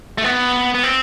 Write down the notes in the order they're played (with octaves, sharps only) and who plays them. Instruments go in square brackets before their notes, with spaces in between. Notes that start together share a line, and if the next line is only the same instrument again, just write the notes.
[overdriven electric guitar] A3
B3
B3
C4